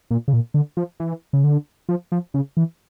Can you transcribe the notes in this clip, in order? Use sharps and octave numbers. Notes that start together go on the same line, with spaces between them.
A#2
C#3
A#2
D3
F3
E3
C#3
D3
F3
F3
C#3
E3